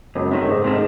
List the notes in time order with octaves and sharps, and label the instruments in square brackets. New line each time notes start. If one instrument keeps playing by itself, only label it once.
[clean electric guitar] C#2 [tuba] F#2
[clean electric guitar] C3 D#3 A3
[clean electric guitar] C#2 [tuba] G#2
[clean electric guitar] C3 D#3 A3